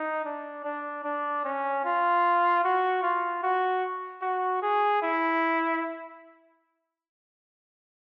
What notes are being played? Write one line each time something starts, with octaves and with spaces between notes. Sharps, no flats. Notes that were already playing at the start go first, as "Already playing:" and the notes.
Already playing: D#4
D4
D4
D4
C#4
F4
F#4
F4
F#4
F#4
G#4
E4